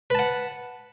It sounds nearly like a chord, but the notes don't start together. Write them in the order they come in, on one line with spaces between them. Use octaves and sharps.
B4 A5 F#5